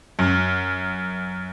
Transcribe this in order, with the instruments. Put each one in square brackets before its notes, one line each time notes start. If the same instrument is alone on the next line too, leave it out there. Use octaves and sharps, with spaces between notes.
[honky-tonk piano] F#2